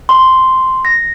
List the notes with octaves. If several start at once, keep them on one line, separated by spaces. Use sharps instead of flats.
C6
A#6